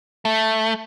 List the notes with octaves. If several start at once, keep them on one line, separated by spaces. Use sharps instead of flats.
A3